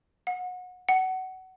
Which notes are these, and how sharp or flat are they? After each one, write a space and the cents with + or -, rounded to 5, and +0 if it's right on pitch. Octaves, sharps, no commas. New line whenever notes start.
F#5 -25
F#5 +20